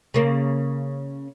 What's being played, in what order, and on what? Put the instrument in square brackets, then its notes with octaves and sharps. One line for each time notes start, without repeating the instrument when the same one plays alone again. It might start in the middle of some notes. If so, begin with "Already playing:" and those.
[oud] C#3 A#3